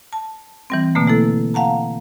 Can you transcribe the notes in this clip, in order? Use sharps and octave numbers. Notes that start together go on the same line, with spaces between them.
A5
E3 G3 C4
B2 D3 A3 A#3
A3 E4 A4
F5 F#5 A5 A#5